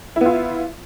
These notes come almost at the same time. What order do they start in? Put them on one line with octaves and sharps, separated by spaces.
E4 B3 F4